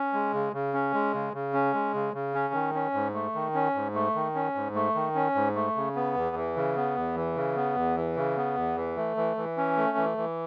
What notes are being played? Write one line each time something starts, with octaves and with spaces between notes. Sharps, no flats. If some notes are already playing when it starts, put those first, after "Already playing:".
Already playing: C#4
G#3
C#3
C#3
C#4
G#3
C#3
C#3
C#4
G#3
C#3
C#3
C#4
D#3
C#4
G#2
A3
D#3
C#4
G#2
A3
D#3
C#4
G#2
A3
D#3
C#4
G#2
A3
C#3
B3
E2
E3
C#3
B3
E2
E3
C#3
B3
E2
E3
C#3
B3
E2
E3
A3
E3
E3
C#4
A3
E3
E3